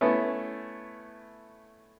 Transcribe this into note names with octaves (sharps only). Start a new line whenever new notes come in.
A3 B3 C#4 E4